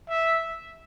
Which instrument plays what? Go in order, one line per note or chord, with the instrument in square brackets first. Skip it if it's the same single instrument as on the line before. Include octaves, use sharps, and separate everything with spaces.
[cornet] E5